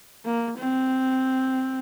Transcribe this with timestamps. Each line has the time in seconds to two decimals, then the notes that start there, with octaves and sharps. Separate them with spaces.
0.26 A#3
0.58 C4